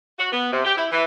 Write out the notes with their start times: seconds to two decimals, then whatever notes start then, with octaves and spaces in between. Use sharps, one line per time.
0.18 F#4
0.32 B3
0.52 C3
0.65 G4
0.77 E4
0.91 E3